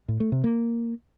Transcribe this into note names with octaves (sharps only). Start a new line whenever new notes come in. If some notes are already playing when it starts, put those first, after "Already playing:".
A2
A3
C3
A#3